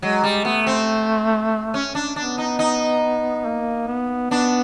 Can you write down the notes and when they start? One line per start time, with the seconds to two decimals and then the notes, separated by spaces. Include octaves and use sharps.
0.02 F#3 G#3
0.23 G3
0.45 A3 B3
0.66 C4
1.74 C#4
1.95 D4
2.16 B3 D4
2.38 D#4
2.59 D#4
3.45 A#3
3.87 B3
4.30 B3 D4